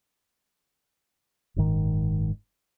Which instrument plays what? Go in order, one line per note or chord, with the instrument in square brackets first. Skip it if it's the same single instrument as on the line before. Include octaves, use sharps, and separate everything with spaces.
[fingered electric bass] F#1 G#2 D#3